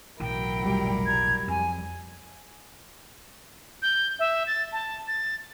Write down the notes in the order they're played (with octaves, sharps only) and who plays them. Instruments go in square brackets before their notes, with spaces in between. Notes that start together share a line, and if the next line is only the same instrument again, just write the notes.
[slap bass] B1 A2 E3 [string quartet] F#3 E4 A#4 [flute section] G5
[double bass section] F1 G3
[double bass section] G3 [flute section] A#5 G#6
[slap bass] F2 [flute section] G#5
[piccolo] G6
E5
A6
A5
A6